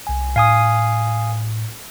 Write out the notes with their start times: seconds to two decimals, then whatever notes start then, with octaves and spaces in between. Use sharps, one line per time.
0.07 C2 G#5
0.36 A2 F5 G#5 D#6